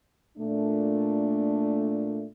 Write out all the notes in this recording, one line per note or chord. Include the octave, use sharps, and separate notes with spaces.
A#2 A3 D4